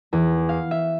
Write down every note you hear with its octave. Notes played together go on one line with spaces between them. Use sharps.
E2
F5
E5